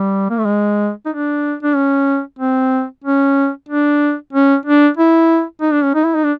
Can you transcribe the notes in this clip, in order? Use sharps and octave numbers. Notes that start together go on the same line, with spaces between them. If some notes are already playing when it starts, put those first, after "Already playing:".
Already playing: G3
A#3
A3
G#3
D#4
D4
D4
C#4
C4
C#4
D4
C#4
D4
E4
D#4
D4
C#4
D#4
E4
D#4
D4